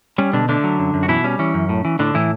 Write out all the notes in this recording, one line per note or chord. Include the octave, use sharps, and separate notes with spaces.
G3 C#4
B2 D3 D4
D3 A3 D4
F#3
F#2
F#2
F#4
B2 E3 E4
G3 C#4
E3 C#4
F#2
A2
E3
A2 D3 D4
A2 E3 E4